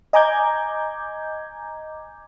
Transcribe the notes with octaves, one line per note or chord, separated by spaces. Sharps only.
D#5 G#5 A#5 D6 G6 G#6